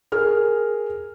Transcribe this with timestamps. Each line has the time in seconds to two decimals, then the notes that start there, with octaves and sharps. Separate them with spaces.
0.12 G#4 A#4 F6